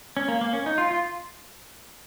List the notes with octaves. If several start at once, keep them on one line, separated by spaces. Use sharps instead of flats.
C#4
A#3
A#3
C#4
D#4
F4
F4